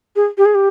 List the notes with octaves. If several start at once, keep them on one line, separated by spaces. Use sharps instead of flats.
G#4
G4
G#4
G4